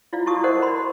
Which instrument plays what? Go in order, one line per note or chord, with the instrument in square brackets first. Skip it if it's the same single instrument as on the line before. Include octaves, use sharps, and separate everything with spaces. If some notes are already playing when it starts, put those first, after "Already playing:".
[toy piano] E4 F4 D5 F5
E4 F#4 A5 C#6 D#6
A4 A#4 C5 D5 D#5 F#5
B5 C6